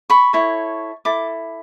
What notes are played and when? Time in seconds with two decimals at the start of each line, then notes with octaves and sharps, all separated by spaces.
0.10 B5 C#6
0.33 E4 A4 C#5
1.05 E4 A4 D6